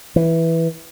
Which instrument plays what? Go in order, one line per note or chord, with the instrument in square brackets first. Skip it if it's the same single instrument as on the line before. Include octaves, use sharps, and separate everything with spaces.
[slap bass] E3